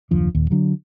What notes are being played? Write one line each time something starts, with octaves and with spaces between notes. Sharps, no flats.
F#1 D#2 F3 D4
D#1 D#2
D3 F#3 D4